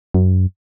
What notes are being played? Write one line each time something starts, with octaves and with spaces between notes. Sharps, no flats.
F#2